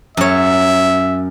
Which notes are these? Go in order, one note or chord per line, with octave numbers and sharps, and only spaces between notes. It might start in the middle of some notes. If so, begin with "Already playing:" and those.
F#2 C#5 E5